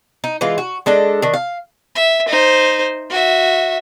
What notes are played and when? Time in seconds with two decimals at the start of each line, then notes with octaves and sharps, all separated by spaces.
0.24 D#4
0.41 E3 G#3 F4
0.58 F#4
0.86 G#3 D4 A4 D#5
1.22 D#3 D4
1.34 F5
1.95 E5
2.28 D#4 C5
3.10 F#4 E5